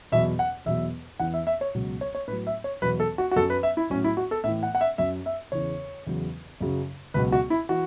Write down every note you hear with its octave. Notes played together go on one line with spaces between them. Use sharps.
E2 B2 F#3 E5
F#5
E2 B2 F#3 E5
E2 E3 F#5
E5
E5
C#5
C#2 B2 F#3
C#5
C#5
A2 F#3 B4
E5
C#5
E2 B2 F#3 B4
A4
F#4
F#4
F#2 F#3 A4
B4
E5
E4
A2 F#3 C#4
E4
F#4
A4
A2 E3 E5
F#5
F#5
E5
F#2 F#3 E5
E5
E2 C#3 E3 C#5
E2 C#3 F#3
F#2 C#3 F#3
C#2 B2 F#3 B4
F#4
E4
E3 F#4